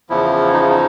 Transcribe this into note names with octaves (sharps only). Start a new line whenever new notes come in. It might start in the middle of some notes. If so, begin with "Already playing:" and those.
E2 C#3 F3 E4
D#4
E4
D#4